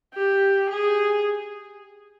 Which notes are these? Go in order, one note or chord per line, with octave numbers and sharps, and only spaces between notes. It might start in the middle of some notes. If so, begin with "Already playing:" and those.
G4
G#4